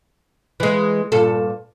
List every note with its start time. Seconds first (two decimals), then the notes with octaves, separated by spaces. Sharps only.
0.60 E3 G#3
1.12 G2 A#2 A4